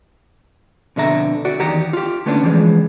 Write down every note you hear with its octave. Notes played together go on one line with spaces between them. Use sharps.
F2 B2 D3 E5 A#5
F#4 D5
E2 D#3 G4 F#5 A#5
F4 G4
D3 A3 B3 C#4 D4
C#3 E3 F3 G#3